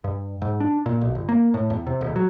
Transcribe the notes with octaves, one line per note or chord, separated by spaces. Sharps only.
G2
G#2
D4
A#2
B1
G1
A#3
A2
E2
C3
D#1
F#3